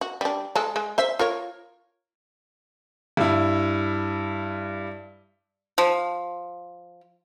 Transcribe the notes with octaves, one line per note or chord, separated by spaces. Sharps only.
F#4
G3 D4
G#3 A4
G#3
C5 E5
F4 A#4 C#5
G2 E4
F3